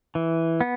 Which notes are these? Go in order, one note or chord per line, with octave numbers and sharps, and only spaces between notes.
E3
B3